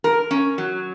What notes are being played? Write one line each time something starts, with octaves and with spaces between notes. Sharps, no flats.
A#4
C#4
F#3